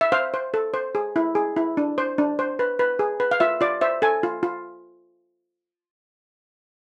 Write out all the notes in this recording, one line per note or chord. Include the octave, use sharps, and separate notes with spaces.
E5
C5 F5
C5
A4
C5
G#4
E4
G#4
E4
D4
C5
D4
C5
B4
B4
G#4
B4
F5
F4 E5
F4 D5
C5 E5
A4 G#5
F4
F4